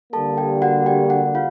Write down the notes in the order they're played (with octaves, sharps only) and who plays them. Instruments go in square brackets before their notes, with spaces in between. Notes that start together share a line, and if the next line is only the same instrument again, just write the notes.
[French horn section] D3 G3 A#3 [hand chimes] A4 A5
[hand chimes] G4 G5
F#4 F#5
G4 G5
F#4 F#5
F4 F5